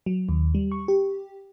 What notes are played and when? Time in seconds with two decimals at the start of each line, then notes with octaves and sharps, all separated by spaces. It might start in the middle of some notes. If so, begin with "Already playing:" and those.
0.06 F#3
0.29 D#2
0.55 G3
0.72 C#6
0.88 G4